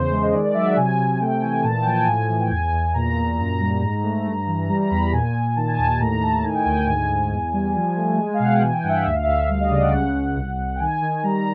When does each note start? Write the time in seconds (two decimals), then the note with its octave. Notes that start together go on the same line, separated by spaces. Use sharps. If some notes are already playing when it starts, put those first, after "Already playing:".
Already playing: E2 C#3 C5
0.11 G#3
0.22 D#5
0.33 D#3 D5
0.44 D5
0.54 F#3 E5
0.66 F#5
0.76 C3 G#5
0.98 C3
1.20 A3 G5
1.41 E3 G#5
1.63 A#2 A5
1.82 G5
1.85 F3 G#5
2.07 A2 G#5
2.29 E3
2.40 G5
2.51 E2 G#5
2.72 E2
2.94 A#2 A#5
3.16 A#2
3.39 F#2 A#5
3.60 G3
3.82 G#2
4.03 A3
4.25 G2
4.47 E3
4.69 G3 A#5
4.80 A#5
4.90 E2 B5
5.12 A#2 G#5
5.35 A#2
5.56 D#3 A5
5.67 G#5
5.78 D#2 A5
6.00 A2 A#5
6.22 A2 A5
6.43 D#3 G#5
6.54 G5
6.65 D2 G#5
6.76 G5
6.87 G#2 G#5
7.08 G#2
7.31 E2
7.53 G3
7.74 F3
7.96 A3
8.18 G#3
8.34 F5
8.40 B2 F#5
8.52 G5
8.62 E3 G#5
8.73 G5
8.83 G2 F#5
8.89 E5
8.94 F5
9.05 D2 E5
9.14 F5
9.23 D2 E5
9.49 G3 F5
9.60 D#5
9.70 C#3 D5
9.81 F#5
9.92 C#2
10.14 C#2
10.37 C2
10.57 C2
10.76 G5
10.80 D#3 G#5
11.02 D#3
11.23 G3 A#5